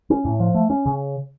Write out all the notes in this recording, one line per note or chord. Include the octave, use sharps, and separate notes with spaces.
C#4
A2
F3
A3
C#4
C#3